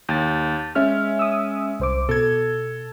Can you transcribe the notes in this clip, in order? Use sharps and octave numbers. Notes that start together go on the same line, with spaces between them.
D#2 G6 A6
G#3 C#4 E5 F6
D#6 E6
C2 C5 D6
B2 A4 G#6